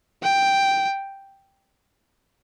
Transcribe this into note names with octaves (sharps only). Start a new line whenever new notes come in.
G5